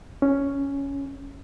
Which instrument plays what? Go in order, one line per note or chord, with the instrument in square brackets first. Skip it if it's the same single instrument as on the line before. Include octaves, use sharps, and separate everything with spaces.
[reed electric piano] C#4